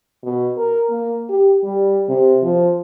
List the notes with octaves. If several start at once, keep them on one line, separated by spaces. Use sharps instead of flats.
B2
A#4
A#3
G4
G3
C3
F3